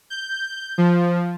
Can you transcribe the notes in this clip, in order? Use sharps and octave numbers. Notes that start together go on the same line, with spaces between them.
G6
F3